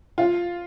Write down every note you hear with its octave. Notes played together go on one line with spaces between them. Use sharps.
F4